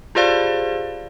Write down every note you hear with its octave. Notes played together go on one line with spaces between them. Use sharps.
F4 G4 G#4 C5 D5 F5